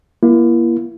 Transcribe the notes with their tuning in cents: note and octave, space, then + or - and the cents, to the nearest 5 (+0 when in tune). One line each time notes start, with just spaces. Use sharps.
A#3 +35 E4 +30